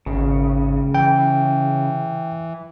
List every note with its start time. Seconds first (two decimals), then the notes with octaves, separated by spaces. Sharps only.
0.06 G#1 C#3
0.95 E3 G5